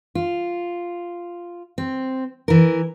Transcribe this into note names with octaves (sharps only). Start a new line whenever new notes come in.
F4
C4
E3 A#4